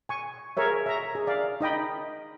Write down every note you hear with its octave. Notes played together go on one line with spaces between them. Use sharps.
G#5 C#6
G#4 A#4 C#5 E5
E5 A#5
G#4
D5 F5
D#4 D#5 G5 B5